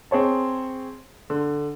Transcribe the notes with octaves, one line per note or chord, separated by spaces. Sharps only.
C4 G#4 C#5 A5
D3